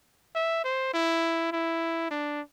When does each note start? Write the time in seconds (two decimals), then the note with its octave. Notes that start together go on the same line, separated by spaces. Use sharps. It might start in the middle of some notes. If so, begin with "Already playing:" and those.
0.35 E5
0.64 C5
0.94 E4
1.52 E4
2.11 D4